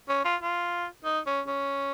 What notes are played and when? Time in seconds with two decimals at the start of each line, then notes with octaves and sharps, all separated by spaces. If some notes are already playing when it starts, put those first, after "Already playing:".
0.09 C#4
0.25 F4
0.41 F4
1.05 D#4
1.26 C#4
1.47 C#4